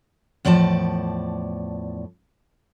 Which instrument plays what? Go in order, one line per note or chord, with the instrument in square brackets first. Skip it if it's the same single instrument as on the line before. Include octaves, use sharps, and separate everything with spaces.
[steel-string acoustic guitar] E2 A2 F3 D5 A5